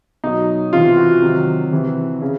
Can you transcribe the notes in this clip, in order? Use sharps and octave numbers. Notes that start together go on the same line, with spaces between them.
B2 F#3 D#4
C3 E3 F4
F#4
C3 D#3 F#3
C3 E3
C#3